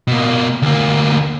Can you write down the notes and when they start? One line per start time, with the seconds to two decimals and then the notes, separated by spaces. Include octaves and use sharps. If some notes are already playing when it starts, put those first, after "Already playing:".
0.07 B2 A#3
0.62 D2 A#3